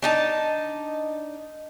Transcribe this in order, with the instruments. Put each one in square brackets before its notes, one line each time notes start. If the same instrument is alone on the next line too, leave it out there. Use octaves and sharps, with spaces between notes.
[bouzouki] D4 D#4 A5